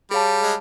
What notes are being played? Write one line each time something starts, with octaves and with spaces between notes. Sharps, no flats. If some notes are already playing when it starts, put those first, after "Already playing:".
G3 G#4 C#5 F5 A5
G#3